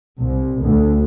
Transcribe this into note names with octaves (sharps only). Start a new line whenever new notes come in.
C2
D2